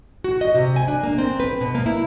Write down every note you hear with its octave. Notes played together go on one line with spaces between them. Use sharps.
F#4
D#5
C3
G#5
D4
A#3
C4
B4
B2
A#3
E4